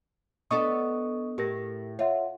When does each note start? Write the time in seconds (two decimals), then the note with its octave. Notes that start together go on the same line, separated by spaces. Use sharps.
0.51 B3 D4 A4 D#5 C#6 D#6
1.38 A2 G4 A#4 A#6
1.99 F4 C#5 E5 F#5